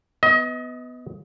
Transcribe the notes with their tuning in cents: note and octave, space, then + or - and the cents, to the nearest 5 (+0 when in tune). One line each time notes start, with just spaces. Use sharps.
B3 +10 D#5 +30